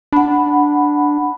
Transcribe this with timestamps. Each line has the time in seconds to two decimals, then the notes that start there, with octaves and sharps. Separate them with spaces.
0.12 D4 F#5 B5